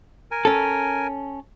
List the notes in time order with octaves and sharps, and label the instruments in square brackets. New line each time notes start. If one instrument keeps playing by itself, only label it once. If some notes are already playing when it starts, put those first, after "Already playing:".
[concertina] A#4 G#5
[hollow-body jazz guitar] C#4 A4